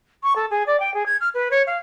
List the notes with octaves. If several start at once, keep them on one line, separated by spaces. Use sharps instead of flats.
C#6
A4
G#4
D5
G5
G#4
G#6
F6
B4
C#5
F5